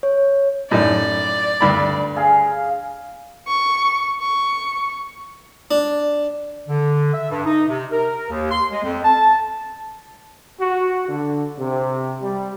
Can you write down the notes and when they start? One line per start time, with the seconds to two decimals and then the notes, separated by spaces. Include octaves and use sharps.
0.03 C#5
0.71 F#2 A2 D#4 D5
1.61 D2 G2 B5
2.16 G#4 F5
3.47 C#6
4.20 C#6
5.71 D4
6.68 D3
7.14 E5
7.30 G2
7.46 D#4
7.68 C3
7.92 A#4
8.30 D#2
8.51 C6
8.71 G#3
8.83 F2
9.04 A5
10.59 F#4
11.09 D3
11.59 C3
12.23 G3